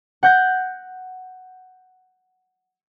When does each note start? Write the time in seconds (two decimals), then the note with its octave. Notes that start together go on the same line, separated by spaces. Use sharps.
0.23 F#5 G6 A#6